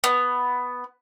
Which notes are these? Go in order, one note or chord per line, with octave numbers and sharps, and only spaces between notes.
B3